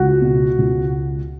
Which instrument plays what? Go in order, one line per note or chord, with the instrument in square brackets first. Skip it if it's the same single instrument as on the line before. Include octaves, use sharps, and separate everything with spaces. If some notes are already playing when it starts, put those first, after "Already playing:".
Already playing: [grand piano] C#2 [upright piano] F#4
[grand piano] B2
C#2